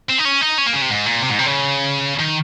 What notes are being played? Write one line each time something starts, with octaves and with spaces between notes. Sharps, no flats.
C4
D#4
C#4
D#4
C#4
A#3
C#3
C3
G#2
A#2
C3
G#2
C3
C#3
D#3